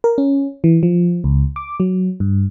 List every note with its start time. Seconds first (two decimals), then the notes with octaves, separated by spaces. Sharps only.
0.04 A#4
0.18 C#4
0.64 E3
0.83 F3
1.24 C#2
1.56 D6
1.80 F#3
2.20 G2